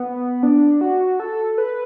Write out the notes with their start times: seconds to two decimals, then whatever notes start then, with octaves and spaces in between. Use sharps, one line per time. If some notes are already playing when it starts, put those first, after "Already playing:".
Already playing: B3
0.43 D4
0.81 F#4
1.20 A4
1.58 B4